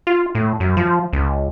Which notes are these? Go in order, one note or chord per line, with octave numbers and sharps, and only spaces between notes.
F4
A2
F#2
F3
C#2